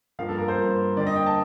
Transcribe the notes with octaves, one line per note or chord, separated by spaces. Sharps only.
G2 F3 A#3 F5
A4
A#4
C5
G2 F3 A#3
D3 G3 A#3 D5
D#5
G5
A5